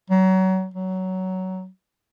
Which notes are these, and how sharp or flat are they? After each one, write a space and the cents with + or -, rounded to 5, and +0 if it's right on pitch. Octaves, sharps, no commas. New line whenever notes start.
F#3 +30
F#3 +15